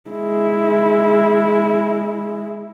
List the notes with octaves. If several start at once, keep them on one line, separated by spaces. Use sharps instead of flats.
G#3 E4